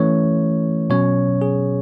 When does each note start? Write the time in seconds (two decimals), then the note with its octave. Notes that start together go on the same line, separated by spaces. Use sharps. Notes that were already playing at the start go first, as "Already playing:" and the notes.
Already playing: E3 A3 C#4 C#5
0.90 B2 F#3 C#4 C#5
1.42 G#4